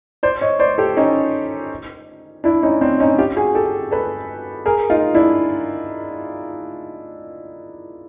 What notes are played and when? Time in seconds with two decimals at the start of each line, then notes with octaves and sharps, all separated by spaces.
0.23 C5 D5
0.41 C#5 D#5
0.59 C5 D5
0.78 G4 A4
0.97 C#4 D#4
2.44 D4 E4
2.63 C#4 D#4
2.81 C4 D4
3.00 C#4 D#4
3.19 F4 G4
3.37 F#4 G#4
3.55 G4 A4
3.91 A4 B4
4.66 G#4 A#4
4.90 D#4 F4
5.15 D4 E4